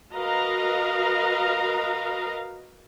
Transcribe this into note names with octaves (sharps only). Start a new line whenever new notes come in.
F#4 A#4 B4 D#5 F5 A#5